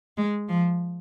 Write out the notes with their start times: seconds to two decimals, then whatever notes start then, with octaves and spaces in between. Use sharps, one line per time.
0.17 G#3
0.48 F3